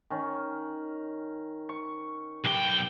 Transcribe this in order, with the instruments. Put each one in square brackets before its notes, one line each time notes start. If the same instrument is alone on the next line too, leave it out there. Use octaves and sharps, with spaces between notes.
[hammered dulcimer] D#3 C#4
C#6
[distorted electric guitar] B1 G5 [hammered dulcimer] G4 B4